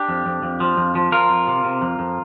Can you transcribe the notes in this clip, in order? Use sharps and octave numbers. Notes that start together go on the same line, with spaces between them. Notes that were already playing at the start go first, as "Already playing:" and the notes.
Already playing: D4 G4
F2
F2
F2
F3
F2
F3
F3 F4 A#4
F2
C3
C3
F2
F2